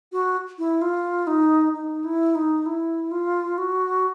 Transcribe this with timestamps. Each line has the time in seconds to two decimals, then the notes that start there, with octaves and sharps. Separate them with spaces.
0.12 F#4
0.58 E4
0.82 F4
1.27 D#4
1.73 D#4
2.04 E4
2.35 D#4
2.66 E4
3.12 F4
3.58 F#4